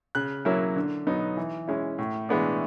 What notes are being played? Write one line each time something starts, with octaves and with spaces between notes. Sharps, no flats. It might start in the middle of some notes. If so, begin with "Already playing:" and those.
C#3 F#6
F#3 A#3 C#4 E4
D3
F#3 B3 D#4
E3
G#3 C#4 E4
A2
E3 G#3 B3 D4